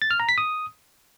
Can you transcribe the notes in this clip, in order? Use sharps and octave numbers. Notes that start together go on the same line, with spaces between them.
A6
F6
A#5
B6
D#6